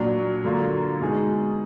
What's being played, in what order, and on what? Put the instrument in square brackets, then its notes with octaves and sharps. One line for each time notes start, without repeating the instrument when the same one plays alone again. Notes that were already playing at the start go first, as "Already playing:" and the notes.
Already playing: [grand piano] A#2 F#3 D4
D3 F#3 A#3 F4
B2 G#3 D#4 G#4